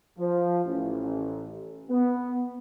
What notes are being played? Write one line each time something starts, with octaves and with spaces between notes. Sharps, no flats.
F3
A1
B3